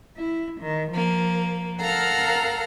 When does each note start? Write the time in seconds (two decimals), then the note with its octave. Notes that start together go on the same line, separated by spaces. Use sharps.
0.17 E4
0.60 D#3
0.90 F3 A#3
1.80 A4 A#4 F5 F#5 A#5 F6